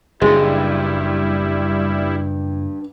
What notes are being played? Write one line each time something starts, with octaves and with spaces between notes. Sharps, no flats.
F#1 G2 A#2 G3 G#3 E4